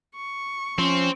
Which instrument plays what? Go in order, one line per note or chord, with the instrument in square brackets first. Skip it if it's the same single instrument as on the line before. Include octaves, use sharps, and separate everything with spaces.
[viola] C#6
[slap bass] F3 [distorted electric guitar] C4 [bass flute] C#4